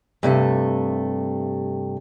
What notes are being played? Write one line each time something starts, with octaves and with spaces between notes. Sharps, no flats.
G2 C3 A3